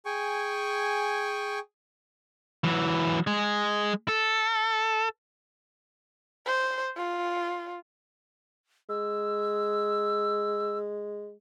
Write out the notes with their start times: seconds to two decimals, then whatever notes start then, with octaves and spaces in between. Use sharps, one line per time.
0.05 G#4 G5 G#5 C#6
2.64 E3 F#3
3.27 G#3 G#4
4.08 A4
6.46 C5
6.97 F4
8.89 G#3 E6